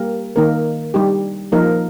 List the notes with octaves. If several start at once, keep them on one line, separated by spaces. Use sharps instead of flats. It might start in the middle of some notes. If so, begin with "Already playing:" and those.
Already playing: G3 A#3 G4 A#4
D#3 A#3 D#4 A#4
G3 D#4 G4
F3 A#3 D#4 A#4